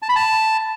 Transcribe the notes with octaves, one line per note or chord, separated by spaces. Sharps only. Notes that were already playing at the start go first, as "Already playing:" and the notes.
A5
B5
A5